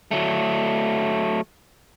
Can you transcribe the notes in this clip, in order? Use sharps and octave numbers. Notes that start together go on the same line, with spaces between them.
F#3 A3